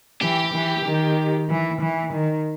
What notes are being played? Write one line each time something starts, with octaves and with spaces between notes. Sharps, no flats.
E3 G4
E3
D#3
E3
E3
D#3